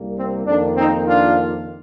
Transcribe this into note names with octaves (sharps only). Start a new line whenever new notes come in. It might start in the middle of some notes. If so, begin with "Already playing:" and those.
Already playing: C2 C3 G3 A#3
C4
F2 D#3 A#3 D4
C4 D#4
D4 F4